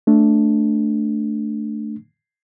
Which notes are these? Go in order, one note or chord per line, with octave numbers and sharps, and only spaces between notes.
A3 D4